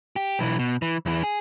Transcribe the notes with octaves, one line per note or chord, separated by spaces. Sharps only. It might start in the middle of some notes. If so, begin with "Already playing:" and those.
G4
B1 E3
B2
E3
E2 E3
G#4